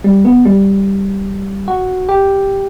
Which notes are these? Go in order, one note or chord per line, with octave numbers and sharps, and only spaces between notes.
G3
B3
G3
F#4
G4